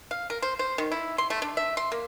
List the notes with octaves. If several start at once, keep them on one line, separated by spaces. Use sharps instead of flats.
F5
A#4
C5
C5
D#3
E4
C6
A3
D4
E5
C6
A#3